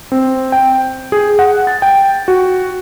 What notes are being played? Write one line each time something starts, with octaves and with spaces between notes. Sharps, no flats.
C4
G5
G#4
F#5
A6
G5
F#4